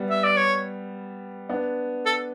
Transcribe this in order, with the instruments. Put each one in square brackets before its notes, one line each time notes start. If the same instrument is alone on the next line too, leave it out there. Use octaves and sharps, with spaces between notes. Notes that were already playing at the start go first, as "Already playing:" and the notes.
Already playing: [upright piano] G3 B3
[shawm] E5
D5
C#5
[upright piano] B3 D4
[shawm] A4